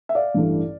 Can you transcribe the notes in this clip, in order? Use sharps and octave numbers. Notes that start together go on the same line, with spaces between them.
E5
D5 F5
A1 G2 E3 A3